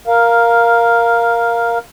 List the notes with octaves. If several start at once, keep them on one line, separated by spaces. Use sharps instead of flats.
A#4 F5